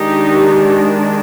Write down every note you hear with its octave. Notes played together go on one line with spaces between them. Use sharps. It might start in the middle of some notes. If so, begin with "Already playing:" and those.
Already playing: D#3 G#3 D4 D#4 G4